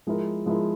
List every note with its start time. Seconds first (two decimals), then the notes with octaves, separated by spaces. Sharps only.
0.07 F3 G#3 E4 A#4
0.46 F3 G#3 E4 A#4